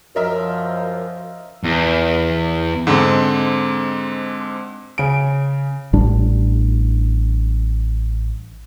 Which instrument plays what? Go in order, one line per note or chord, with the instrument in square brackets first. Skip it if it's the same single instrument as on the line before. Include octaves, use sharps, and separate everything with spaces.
[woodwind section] F#2 [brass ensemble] F3 [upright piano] A#4 D#5 E5
[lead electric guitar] E2
[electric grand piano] G#2 D3 G#3 C4
[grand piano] C#3 D7
[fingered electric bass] A1 A2 G3 D4